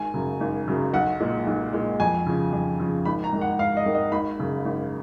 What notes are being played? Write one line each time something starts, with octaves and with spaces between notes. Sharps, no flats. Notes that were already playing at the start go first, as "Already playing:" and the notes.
Already playing: G#1 G#5
F#2 C#3 F#3
G#1
F#2 C#3 F#3
B1 F#5
A#2 G#3
B1
A#2 G#3
F2 G#5
C#3 F3
F2
C#3 F3
G#1 B5
A#5
G#2 D#3
F#5
G#1 F5
D#5
G#2 D#3
D#5
G#1 B5
F#2 C#3
G#1